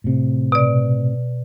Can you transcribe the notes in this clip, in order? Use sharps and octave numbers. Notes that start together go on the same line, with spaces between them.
A2 C3
B2 D5